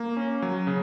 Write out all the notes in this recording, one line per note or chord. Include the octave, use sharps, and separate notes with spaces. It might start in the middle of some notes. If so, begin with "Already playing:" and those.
Already playing: A#3
C#4
F#3
C#3